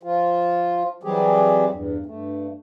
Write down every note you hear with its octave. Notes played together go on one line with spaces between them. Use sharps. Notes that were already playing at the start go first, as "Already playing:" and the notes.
F3 F4
E3 F#3 G3 C4 G4 G#4
E2 G2
G2 A3